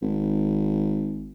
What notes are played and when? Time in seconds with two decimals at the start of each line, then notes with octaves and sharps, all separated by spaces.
0.02 G#1